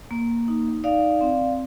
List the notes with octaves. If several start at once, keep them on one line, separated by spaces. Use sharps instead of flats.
A#3
D#4
D#4 D5 F5
C4